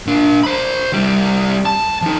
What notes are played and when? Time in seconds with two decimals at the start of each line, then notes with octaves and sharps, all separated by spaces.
0.07 A#2 D4
0.43 C5 B5
0.93 C2 G3
1.66 A5
2.02 F3 D#4